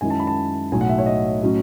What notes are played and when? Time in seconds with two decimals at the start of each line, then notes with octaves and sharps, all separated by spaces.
0.01 F#2 D#3 G#3 C#4 E4 G#5
0.10 A5
0.20 B5
0.27 A5
0.72 B1 A2 F#3 G#5
0.81 F#5
0.89 E5
0.98 C#5
1.06 D#5
1.42 A2 F#3 C#4